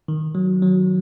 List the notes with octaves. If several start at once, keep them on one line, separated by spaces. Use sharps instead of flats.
D#3
F#3
F#3